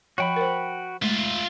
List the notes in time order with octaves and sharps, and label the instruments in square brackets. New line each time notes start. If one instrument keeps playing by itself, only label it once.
[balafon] F3 C#5 [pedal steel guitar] F#4 G5 B5
[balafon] A#4 C5
[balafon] G#3 A3 [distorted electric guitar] F4 E5